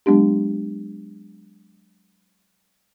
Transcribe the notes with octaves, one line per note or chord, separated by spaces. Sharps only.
F#3 G#3 B3 D4 G4